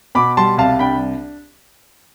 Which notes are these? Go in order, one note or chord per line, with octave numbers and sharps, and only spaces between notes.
B2 B5 D6
G3 A5 C6
C2 F5 A5
D4 G5 B5